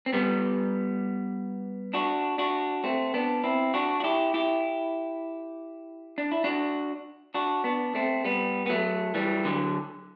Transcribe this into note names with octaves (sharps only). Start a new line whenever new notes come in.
C4
G3 B3
D4 F#4
D4 F#4
A3 C4
B3 D4
C4 E4
D4 F#4
F#4
E4 G4
E4 G4
D4
E4
D4 F#4
D4 F#4
B3 D4
A3 C4
G3 B3
B3
F#3 A3
E3 G3
D3 F#3